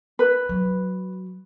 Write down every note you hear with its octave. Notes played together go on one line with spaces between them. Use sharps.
B4
F#3